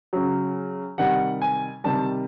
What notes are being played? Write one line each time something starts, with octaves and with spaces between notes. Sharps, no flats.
C#3 F#3
C3 D#3 G3 F#5
G#5
C3 D#3 G3 A5